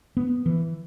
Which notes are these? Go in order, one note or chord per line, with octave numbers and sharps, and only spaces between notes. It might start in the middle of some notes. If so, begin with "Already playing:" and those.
B3
E3